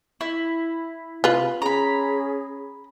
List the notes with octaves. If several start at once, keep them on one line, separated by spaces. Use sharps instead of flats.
E4
C3 F4 B4
C#4 G#4 A#5 B5